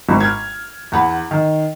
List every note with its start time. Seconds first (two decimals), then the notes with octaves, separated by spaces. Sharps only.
0.09 G#1
0.20 F6 G#6
0.92 E2 F#5 B5
1.31 D#3